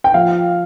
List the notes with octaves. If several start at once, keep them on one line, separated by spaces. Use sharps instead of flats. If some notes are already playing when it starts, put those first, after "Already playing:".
G5
F3 F5